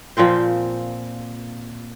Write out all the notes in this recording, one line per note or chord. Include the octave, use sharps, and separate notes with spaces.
A#2 F3 C4 C5